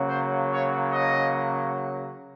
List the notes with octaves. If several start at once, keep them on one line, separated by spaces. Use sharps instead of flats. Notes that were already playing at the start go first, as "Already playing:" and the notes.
Already playing: C#3 F#3 A#3
C5
C#5
D#5